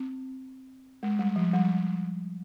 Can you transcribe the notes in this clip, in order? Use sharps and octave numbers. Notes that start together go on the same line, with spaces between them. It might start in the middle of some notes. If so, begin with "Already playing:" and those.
Already playing: C4
G#3
G3
F3
G3